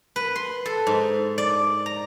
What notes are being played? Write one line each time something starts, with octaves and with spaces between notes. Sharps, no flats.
B4
C6
A4
G#2
D5
A#5